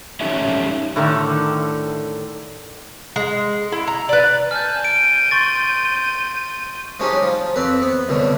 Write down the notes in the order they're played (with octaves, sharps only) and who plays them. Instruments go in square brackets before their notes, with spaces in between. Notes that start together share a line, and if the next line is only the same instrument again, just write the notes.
[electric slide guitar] C#4 D#4 G4 A4 C#5 E5
[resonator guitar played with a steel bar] A2 D3 D#3
[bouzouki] G#3
E4
A#5
B4 D5
[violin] G#5 A5 [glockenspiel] F6 G6
[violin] G6 D#7 [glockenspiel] D7
[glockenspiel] C6 C#6 A6
[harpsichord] F3 F#3 G#3 C#4 D#4 G4
F3
F2 C4 B4
B3
C2 F#2 B2 D3